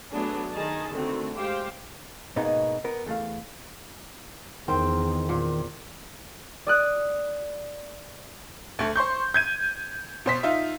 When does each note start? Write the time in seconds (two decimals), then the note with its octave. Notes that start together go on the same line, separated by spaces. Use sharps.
0.12 F#3 A3 B3 D4 G#4
0.52 D#3 D#4 G#4 D#5 A5
0.91 D3 D#3 A3 C4 F#4
1.34 G#3 G4 C5 F5 G5
2.36 G#2 B2 A#3 B3 D#4 G#4
2.84 B3 A#4
3.06 E2 A3 F5
4.68 E2 D#3 C4
5.29 A#2
6.67 D5 D#6 F#6
8.79 D2 A3
8.96 C5 C6 C#6 G6
9.34 G6 G#6 D#7
10.26 B2 C5 B6
10.43 D#4 F4 E5